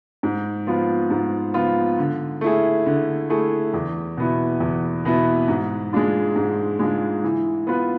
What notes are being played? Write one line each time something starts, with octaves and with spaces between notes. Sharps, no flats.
G#2
F3 B3 F4
G#2
F3 B3 F4
D3
A3 E4 G#4
D3
A3 E4 G#4
E2
B2 B3 E4
E2
B2 B3 E4
G#2
G#3 D4 F4
G#2
G#3 D4 F4
E3
B3 F4 B4